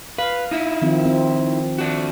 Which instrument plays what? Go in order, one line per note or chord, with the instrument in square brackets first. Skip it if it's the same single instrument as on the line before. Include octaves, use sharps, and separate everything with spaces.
[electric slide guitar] B4 [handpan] F5
[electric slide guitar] D#4 E4
[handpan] D#3 F3 C4
C4
[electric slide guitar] D4 F#4